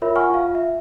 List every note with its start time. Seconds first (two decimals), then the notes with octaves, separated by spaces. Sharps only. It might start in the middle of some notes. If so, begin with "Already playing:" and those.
0.02 F4 A#4 C#5 E5 B5
0.16 F#5 G#5 C#6 F6
0.30 F4 F5
0.55 E5